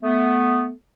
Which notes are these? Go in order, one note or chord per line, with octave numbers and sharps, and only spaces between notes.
A3 B3